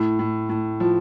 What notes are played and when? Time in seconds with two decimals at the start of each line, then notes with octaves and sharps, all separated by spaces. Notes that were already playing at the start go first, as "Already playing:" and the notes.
Already playing: A2
0.19 A2
0.49 A2
0.80 F3